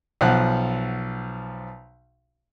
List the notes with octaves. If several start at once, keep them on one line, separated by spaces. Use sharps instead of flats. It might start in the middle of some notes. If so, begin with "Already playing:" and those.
B1 F3 F#5 F#6